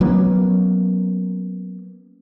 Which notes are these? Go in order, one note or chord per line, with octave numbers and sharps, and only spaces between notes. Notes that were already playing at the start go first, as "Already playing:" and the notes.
F#3 A#3 B3 C#4